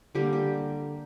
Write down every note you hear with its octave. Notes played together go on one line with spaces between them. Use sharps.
D3 G3 A#3 G4
G4